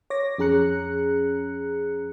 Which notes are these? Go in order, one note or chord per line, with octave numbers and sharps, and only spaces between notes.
C#5 D6 A#6
F2 C#4 G#4 A#5 F#6 C#7